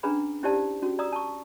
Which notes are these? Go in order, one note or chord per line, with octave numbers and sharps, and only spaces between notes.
C#4 D4 G#4 B4 A#5 B5
C#4 E4 G4 C5 D5 A5
C#4 F#4
D5 A#5 D#6 E6
A5 C#6